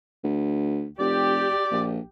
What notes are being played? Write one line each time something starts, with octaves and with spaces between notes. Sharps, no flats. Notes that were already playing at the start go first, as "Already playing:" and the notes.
D2
F1 G4 D5
A#1